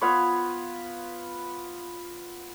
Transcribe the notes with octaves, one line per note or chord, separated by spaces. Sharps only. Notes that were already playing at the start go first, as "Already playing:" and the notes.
B3 F4 B4 C#5